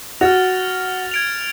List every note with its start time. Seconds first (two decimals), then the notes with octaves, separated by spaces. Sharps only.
0.21 F#4 F6 A6 F7
1.11 G#6 D7 F7